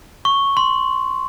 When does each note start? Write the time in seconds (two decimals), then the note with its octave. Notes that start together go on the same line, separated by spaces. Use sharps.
0.25 C#6
0.57 C6